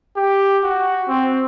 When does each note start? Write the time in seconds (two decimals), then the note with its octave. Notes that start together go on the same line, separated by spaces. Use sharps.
0.16 G4
0.63 F#4
1.08 C4